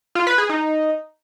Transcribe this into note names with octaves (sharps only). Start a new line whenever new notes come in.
F4
B4
G#4
D#4